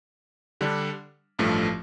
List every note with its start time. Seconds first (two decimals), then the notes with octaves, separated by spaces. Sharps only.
0.61 D3 G3 D4
1.39 A1 G2 F3 A3